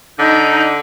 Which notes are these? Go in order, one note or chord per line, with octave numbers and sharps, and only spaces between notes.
D3 D#4 G6